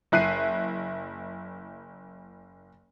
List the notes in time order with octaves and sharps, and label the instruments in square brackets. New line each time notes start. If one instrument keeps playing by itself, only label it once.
[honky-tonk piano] F#1 E4 F#6 C7 D#7